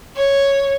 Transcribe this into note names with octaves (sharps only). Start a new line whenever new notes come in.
C#5